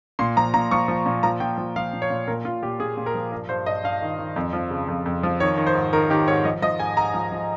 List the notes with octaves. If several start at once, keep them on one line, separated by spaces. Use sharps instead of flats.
A#2 C6
F3 A#5
A#2 A#5
F3 C#6
F3
A#2
F3 A#5
A#2 G5
F3
F3 F5
A#2
C#5
A#2
A#2 A#4
A#2 F4
A#2 G4
A#2 G#4
A#2
A#4
F3
G2 A#4
G2 C5
G2 D#5
G2 F5
D#3
D#3
F2
F3
C#3
F2
F2
F3
D#3 C#5
D#3
C5
G#2
D#3 A#4
D#3 G4
G#2 C#5
F3 D#5
F3 D#5
G#2 G#5
G#2 A#5
F3
F3